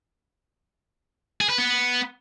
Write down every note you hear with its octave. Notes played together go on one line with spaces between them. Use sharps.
G#4
B4
B3